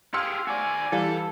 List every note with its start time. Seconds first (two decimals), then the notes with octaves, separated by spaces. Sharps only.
0.14 G4 G#4 F5 C6 E6 C#7
0.47 F#4 D5 G#5
0.92 E3 G3 E4 A4 D5 F5